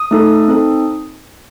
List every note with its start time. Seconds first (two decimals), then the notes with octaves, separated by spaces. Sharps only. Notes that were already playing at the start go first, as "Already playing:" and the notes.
Already playing: D#6
0.11 A3 D#4 A4
0.48 C4 D#4 A4